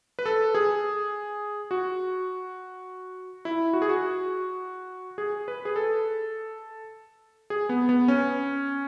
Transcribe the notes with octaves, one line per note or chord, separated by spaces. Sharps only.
B4
A4
G#4
F#4
E4
F#4
G#4
F#4
G#4
B4
G#4
A4
G#4
B3
B3
C#4